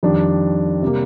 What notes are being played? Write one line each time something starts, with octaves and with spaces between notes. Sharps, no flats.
F2 D#3 G3 D4
C3 G3 A#3